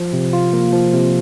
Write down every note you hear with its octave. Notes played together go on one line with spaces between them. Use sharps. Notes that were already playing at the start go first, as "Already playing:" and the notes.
Already playing: F3
C3
F4
A#3
F3
C3